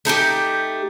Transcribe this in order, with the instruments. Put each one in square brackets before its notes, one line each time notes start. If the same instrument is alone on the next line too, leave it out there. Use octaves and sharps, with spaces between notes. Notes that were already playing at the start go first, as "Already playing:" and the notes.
[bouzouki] A3 D#4 E4 G4